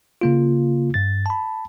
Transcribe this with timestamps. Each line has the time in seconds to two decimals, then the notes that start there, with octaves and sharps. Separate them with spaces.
0.21 C#3 A#3 F4
0.94 G2 A6
1.26 A5 B5